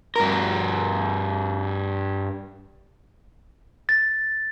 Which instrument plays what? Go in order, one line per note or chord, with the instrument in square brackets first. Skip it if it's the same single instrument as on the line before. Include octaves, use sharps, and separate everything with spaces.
[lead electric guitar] G2 A#4
[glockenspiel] A6